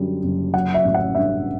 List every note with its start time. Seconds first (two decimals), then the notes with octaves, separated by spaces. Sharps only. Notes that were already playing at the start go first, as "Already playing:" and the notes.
Already playing: F#2 D3 G3
0.23 F#1
0.54 F#3 F#5
0.74 E5
0.85 A1
0.94 F#5
1.15 G2 E5